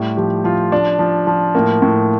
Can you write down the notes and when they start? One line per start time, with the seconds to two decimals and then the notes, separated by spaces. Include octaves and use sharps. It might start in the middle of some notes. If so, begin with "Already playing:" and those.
Already playing: A2 G3
0.17 F3 G4
0.44 F3 F4
0.72 F3 D4
0.99 F3
1.27 F3
1.55 A2 A#3
1.82 A2